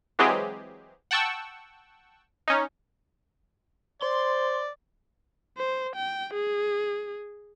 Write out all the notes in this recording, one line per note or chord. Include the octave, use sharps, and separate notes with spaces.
E3 F#3 G#3 C4 G4 G#4
F#5 G5 A5 C#6 E6
C#4 D#4
C5 D5 C6
C5
G5
G#4